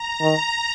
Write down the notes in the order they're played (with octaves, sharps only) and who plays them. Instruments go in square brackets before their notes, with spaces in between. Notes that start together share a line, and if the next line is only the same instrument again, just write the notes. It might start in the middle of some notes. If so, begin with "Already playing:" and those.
Already playing: [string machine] A#5
[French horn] D#3